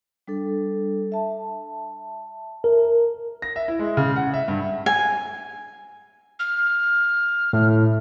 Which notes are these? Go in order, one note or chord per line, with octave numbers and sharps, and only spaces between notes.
G3 D4 A4
E5 A5
A#4
A#6
E5
E4
G#3
C#3
F#5
E5
G2
G#5
F6
A2